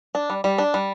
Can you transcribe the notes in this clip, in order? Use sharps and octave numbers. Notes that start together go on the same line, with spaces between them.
D4
G3
G3
D4
G3